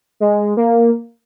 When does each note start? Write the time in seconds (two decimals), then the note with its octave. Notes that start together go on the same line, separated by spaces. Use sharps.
0.20 G#3
0.57 A#3